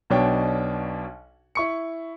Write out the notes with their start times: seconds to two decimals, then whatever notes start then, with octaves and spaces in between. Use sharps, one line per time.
0.10 B1 B2 D4 C#5 G5
1.55 E4 C#6 C#7